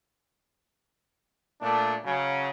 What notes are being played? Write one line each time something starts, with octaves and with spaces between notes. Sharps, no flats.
A#2 A3 D4
C#3 F#3